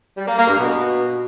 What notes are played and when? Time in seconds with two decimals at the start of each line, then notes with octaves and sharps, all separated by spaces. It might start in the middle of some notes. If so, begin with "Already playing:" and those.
0.17 G3
0.27 A#3
0.37 A#3
0.47 G2
0.58 B2